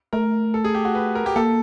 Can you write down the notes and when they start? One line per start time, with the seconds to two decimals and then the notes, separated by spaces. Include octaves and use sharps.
0.13 A3 A#4
0.54 A4
0.64 G#4
0.75 G4
0.85 F#4
0.95 B4
1.15 A#4
1.26 G4
1.36 A#3 A4